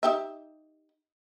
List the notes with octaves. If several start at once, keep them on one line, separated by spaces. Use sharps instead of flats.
D#4 G4 E5